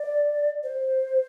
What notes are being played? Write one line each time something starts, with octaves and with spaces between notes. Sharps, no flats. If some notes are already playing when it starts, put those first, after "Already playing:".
Already playing: D5
C5